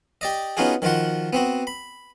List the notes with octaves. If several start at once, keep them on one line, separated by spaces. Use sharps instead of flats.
G4 D5 D#5
B3 C#4 D#4 F4 F#4 G#4
D#3 F3 F4 F#4 F#5
B3 C4 F#4
B5